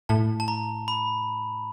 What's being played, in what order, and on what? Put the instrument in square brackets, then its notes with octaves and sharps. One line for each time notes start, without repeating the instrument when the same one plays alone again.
[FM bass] A2 [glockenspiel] A5
[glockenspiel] A5
A#5
B5